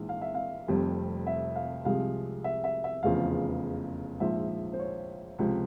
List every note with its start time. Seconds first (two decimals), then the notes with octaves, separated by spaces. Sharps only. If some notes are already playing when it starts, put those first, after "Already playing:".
Already playing: A#1 G#2 E3
0.09 F5
0.21 E5
0.35 F5
0.68 F1 F2 C3 G3
1.27 E5
1.56 F5
1.85 C2 C3 F3 G#3 F5
2.44 E5
2.64 E5
2.84 E5
3.03 F1 E2 C#3 F3 F5
4.20 A#1 G#2 F3 E5
4.73 C5
4.79 C#5
5.39 C#2 C3 F3